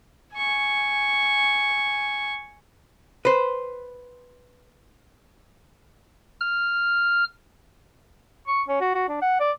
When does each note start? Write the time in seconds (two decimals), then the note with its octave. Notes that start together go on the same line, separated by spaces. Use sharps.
0.34 G#5 C#6
3.25 B4 C5
6.40 F6
8.47 C#6
8.68 C#4
8.81 F#4
8.95 F#4
9.08 D4
9.21 F#5
9.40 D5